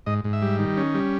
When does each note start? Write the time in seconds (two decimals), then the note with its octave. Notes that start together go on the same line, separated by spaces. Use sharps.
0.06 G#2 D#5
0.24 G#2
0.33 E5
0.42 G3
0.59 D#3
0.77 C#4
0.94 G3